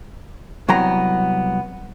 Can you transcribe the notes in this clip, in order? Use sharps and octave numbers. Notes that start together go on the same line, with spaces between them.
C2 F#3 B3 G5 A#5